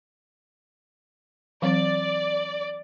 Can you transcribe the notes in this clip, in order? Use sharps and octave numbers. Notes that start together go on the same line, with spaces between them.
E3 F#3 C4 D5